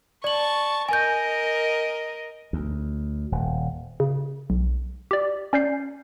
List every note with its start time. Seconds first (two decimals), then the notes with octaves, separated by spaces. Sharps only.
0.24 D5 A5 C#6 F#7
0.89 A#4 D#5 G#5 G6
2.53 D2
3.32 D#1
4.00 C#3
4.50 B1
5.11 G4 D5
5.53 C#4 D5 G6 C7